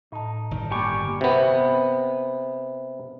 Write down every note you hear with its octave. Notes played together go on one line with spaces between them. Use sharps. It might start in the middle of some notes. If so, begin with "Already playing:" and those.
A2 D#4 A5
G1 D#3
A#3 G4 D5 G#5 B5 C#6 D6
C3 B3